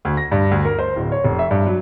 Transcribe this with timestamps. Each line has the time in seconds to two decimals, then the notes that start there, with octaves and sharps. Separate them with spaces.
0.05 D2
0.17 A#6
0.31 G2
0.51 D2
0.65 A#4
0.79 C5
0.96 D1
1.12 C#5
1.24 F1
1.39 E5
1.51 G2
1.66 F#3